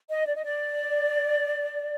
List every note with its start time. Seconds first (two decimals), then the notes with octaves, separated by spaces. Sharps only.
0.10 D#5
0.26 D5
0.35 D#5
0.43 D5